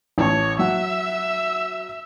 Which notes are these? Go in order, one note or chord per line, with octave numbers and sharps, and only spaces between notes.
A1 C#5 A5 C#6
F#3 E5 F#5 E6